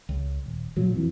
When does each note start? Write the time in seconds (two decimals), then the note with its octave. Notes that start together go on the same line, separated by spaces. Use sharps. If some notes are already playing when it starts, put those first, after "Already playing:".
0.09 C#2
0.46 D#1
0.77 A#2 F3 F#3
0.92 F#1 F2 E3